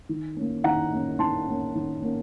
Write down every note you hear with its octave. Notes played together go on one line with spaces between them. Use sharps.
D#3
A#3 C#4
D#3 F#5 A#5
A#3 C#4
D#3 A5 C6
A#3 C#4
D#3
A#3 C#4